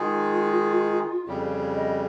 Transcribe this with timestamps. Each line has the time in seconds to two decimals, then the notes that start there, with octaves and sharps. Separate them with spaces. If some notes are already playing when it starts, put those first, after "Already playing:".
Already playing: D#3 G#3 D#4 F4 G#4
1.26 F2 C#3 G3 G4
1.49 C#5
1.72 D#5